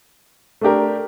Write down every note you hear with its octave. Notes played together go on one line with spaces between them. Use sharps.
A3 D4 G4 A#4